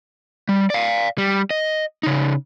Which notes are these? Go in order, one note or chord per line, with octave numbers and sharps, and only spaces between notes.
G3
D5 F5
G3
D#5
C#3 D#4